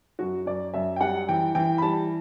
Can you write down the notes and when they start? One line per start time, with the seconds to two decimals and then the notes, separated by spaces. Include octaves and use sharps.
0.19 F#2 F#4
0.46 F#2 D5
0.74 F#2 E5
0.96 G5
1.00 G3 F#5
1.29 E3 G5
1.55 E3 G5
1.78 B5
1.82 G3 A5